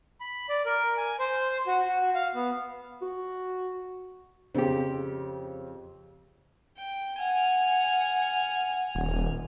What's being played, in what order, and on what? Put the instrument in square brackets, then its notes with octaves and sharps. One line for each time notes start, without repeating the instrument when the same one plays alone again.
[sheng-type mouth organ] B5
D5
A#4
G#5
C5
F#4
F#4
F5
B3
[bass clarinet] F#4
[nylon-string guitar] F2 G4 [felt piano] C#3 C4
[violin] G5
[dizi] F#5 [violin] G#5 F6
[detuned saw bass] D#1